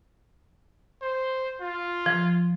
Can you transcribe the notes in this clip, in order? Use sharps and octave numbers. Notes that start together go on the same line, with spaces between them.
C5
F4
F3